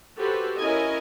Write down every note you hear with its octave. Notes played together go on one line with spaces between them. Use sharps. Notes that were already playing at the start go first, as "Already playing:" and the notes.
F#4 G4 A4 B4 C5
C#4 E4 A#4 D#5 G#5